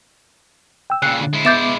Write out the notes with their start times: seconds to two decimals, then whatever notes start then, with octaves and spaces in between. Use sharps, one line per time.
0.90 G5 E6
1.02 A#2 C#3 F#6
1.21 D3
1.33 G#3 E4
1.45 B3 E5 D6 G6 A6 E7